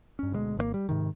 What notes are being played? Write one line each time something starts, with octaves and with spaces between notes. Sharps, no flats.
G2 C#4
D2 B2 G3 G#3
G#1 D3 A#3
G3
G#2 C3 D#3